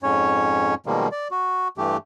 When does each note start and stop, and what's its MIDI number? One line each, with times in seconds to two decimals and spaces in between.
0.03 0.75 41
0.03 0.75 44
0.03 0.75 61
0.03 0.75 73
0.86 1.08 47
0.86 1.08 51
0.86 1.08 53
0.86 1.08 55
0.86 1.08 56
0.86 1.08 58
1.12 1.28 74
1.31 1.68 66
1.78 1.97 43
1.78 1.97 52
1.78 1.97 57
1.78 1.97 67